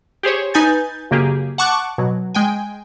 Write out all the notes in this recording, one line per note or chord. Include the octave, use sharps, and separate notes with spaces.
G4 G#4 C5 C#5
D#4 B4 G#5 G6 A6
F#2 C#3 A#3 G4 G#4
F#5 A5 C#6 D6 F#6
B2 F#3
G#3 G5 G#5